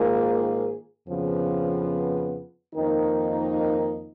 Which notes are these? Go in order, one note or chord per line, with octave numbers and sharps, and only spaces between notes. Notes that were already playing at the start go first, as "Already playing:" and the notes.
Already playing: G#2 D#3 A#3 F4 G#4
F2 C#3 F3 B3
F2 D#3 A#3 D#4